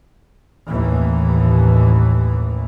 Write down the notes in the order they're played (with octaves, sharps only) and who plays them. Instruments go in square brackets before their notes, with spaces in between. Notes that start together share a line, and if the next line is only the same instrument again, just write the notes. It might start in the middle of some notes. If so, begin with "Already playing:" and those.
[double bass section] A1 D#2 A2 E3